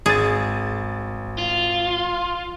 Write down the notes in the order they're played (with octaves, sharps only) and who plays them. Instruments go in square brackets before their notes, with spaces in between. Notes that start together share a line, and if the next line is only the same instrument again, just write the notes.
[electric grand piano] G#1 A6 [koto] G#4
[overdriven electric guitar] F4